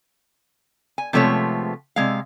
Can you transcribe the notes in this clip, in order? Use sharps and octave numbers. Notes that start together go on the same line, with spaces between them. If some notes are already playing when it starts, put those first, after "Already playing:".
G#5
C3 F3 G#3 A3 B3 C#5
C3 G#3 F5